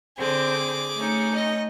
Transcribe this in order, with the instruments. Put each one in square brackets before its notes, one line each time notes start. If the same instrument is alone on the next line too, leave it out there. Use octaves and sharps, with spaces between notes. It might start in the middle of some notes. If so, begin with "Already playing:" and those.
[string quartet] D3 C4 [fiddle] G#4 D6
[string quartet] A3 C#4 D#4
[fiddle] D#5